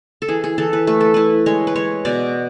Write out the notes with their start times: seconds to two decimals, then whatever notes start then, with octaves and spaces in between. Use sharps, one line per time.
0.22 A4
0.28 E3 G#4
0.44 G#4
0.58 E3 A4
0.73 B4
0.87 A3 B4
1.01 A4
1.14 E4 B4
1.46 G#3 C#5
1.67 B4
1.76 G#3 C#5
2.05 B2 D5